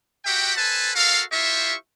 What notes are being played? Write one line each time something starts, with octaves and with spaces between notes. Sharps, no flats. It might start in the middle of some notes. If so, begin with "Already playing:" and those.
F#4 G4 E5 F#5 G5
A4 B4 C5 G#5 A5
F#4 A4 A#4 F5
E4 F4 G4 C5 E5 C#6